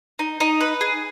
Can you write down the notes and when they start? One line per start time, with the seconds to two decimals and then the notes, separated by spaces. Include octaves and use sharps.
0.19 D#4
0.40 D#4
0.61 B4
0.81 G#4